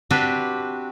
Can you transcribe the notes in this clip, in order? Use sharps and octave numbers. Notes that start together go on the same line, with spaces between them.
C4 D4 F#4 G4 B4